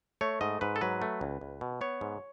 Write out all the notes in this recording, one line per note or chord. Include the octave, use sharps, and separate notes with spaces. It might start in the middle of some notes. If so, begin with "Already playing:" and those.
A3 C#5
G#2 D#5
G#2 B4
A4
F#3 B4
A3
C#2
C#2
B2
B3 C#5
G#2